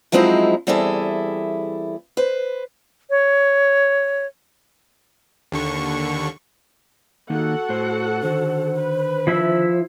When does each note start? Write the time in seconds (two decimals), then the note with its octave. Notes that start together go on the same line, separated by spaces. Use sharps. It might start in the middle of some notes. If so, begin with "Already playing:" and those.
0.12 F3 F#3 G#3 C4 D#4 E4
0.67 E2 G3 C4 E4 G#4 A4
2.17 B4 C5
3.10 C#5
5.52 D#2 D3 C#6
7.30 D#3 A#3 D#4 F#4 A4 F#5
7.69 A2 C5
8.23 D3 D#3 C5
8.79 B4
9.27 F3 E4 E5